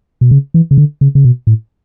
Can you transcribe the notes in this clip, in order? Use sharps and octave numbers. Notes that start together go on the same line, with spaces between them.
B2
C#3
E3
C#3
D3
C#3
C#3
B2
A2